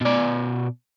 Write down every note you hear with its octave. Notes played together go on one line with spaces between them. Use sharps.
B2 D5